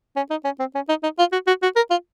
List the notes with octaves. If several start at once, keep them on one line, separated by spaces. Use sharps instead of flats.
C#4
D#4
C#4
C4
C#4
D#4
D#4
F4
F#4
F#4
F#4
A#4
F4